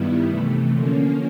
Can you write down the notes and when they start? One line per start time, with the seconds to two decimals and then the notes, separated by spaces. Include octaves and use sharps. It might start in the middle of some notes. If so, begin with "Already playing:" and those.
Already playing: G2 D#3 G3 B3 E4
0.27 C3 E3 A3
0.72 D3 F3 A#3 C#4